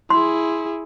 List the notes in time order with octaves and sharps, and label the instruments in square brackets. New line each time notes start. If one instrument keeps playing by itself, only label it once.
[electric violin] E4 G#4 [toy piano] C6